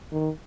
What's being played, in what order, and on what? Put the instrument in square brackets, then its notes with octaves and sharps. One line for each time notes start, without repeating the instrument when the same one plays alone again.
[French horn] D#3